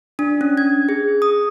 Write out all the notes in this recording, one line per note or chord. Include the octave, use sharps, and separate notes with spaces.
D4
C#4
G#6
G#4
D#6